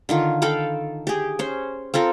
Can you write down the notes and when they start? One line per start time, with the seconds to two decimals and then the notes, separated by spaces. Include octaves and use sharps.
0.09 D3 D#3 F4
0.42 A4 F5 G5 B5
1.07 G4 G#4
1.39 C#4 C5
1.94 C4 F4 A4 A#4